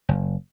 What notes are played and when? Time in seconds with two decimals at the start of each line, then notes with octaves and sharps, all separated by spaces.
0.09 F#1